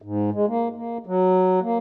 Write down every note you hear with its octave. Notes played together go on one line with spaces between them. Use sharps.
G#2
G#3
A#3
A#3
F#3
A#3